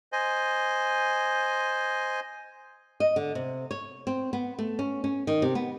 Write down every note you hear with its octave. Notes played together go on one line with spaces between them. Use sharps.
C5 D#5 G#5
D#5
D3
C3
C#5
C4
B3
A3
C#4
C#4
D#3
C3
B3